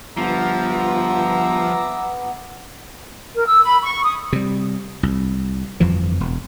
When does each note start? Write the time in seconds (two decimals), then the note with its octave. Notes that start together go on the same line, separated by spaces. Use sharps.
0.17 G1 F3 B3 E5 A#5 D6
3.35 A#4
3.47 E6
3.63 B5
3.82 C#6
4.03 D#6
4.33 C3 G3
5.03 C2
5.80 G1 F2 E3 F3
6.20 E1